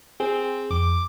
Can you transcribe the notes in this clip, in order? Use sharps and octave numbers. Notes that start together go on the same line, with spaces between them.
C4 G#4
F2 D6